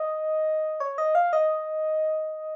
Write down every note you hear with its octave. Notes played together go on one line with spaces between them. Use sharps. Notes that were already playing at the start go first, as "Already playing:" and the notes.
Already playing: D#5
C#5
D#5
F5
D#5